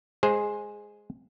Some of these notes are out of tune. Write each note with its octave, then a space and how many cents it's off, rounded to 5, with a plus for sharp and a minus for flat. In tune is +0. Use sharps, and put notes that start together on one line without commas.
G#3 +0 G#4 +0 C5 +10